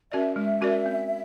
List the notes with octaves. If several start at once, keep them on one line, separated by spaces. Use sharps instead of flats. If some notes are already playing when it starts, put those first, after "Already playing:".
C#4 F#4 A#4 D5 E5
G#3 E5
C#4 F#4 A#4 D5
C4